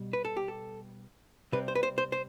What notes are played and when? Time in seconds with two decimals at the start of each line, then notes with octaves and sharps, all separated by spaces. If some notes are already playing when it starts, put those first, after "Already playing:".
Already playing: B2 G3
0.13 B4
0.25 A4
0.37 G4
0.48 A4
1.52 C3 G3 C4 B4
1.68 C5
1.75 B4
1.83 C5
1.98 C5
2.12 C5